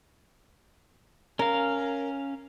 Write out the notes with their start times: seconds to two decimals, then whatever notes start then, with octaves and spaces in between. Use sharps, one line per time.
1.39 C#4 A#4 F5